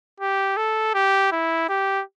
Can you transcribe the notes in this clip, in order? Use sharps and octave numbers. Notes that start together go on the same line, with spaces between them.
G4
A4
G4
E4
G4